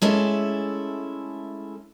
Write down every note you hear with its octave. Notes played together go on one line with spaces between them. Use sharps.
G#3 A3 C#4 E4 A4